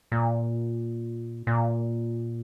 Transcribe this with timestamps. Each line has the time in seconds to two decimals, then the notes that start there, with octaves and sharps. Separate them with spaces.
0.12 A#2
1.47 A#2